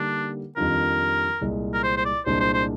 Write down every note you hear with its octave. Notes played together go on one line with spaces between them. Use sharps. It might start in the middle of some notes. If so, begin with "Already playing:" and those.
Already playing: D3 G3 A#3 D4 D#4
F2 D#3 G3 D4 F4 A#4
C2 A#2 G#3
A#4
C5
C5
D5
C2 A#2 G#3 D4 C5
C5
C5